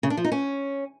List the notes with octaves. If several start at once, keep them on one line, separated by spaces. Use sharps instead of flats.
C#3
D4
F3
D#4
C#4